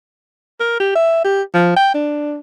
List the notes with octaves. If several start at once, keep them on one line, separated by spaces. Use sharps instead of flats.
A#4
G4
E5
G4
F3
G5
D4